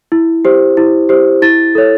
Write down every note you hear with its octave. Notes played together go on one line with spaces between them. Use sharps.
E4
G4 C5
E4
G4 C5
E4 A6
A4 C#5